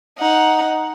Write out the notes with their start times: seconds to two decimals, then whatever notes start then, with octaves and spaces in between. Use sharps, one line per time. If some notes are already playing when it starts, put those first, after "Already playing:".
0.18 D#4 F#5